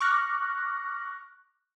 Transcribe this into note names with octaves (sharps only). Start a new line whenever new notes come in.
C#6 D6 F6 F#6 A#6